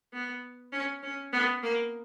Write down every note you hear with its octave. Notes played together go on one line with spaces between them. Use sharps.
B3
C#4
C#4
B3
A#3